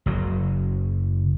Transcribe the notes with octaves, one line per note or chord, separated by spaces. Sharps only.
F#1 F#3